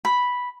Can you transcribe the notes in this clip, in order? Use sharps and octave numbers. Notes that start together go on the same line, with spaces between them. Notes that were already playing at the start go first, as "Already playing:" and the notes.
B5